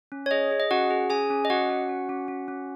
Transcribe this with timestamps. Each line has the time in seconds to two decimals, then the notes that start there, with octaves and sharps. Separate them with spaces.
0.12 C#4
0.26 C#5
0.31 G#4 D#5
0.51 G#4
0.60 D#5
0.71 C#4 F#4 F#5
0.91 G#4
1.10 C#4 G#4 G#5
1.30 C#4
1.45 D#5
1.50 C#4 F#4 F#5
1.70 C#4
1.89 C#4
2.09 C#4
2.28 C#4
2.48 C#4